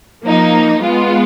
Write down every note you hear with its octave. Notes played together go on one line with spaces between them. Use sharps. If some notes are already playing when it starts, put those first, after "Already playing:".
F3 A#3 D#4
G#3 B3 F4